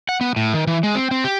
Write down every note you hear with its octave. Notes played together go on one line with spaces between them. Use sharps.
F#5
B3
A2
D#3
E3
G#3
C4
C4
G4